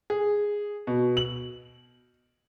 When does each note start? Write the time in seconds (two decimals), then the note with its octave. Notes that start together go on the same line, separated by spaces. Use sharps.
0.10 G#4
0.87 B2
1.17 F#7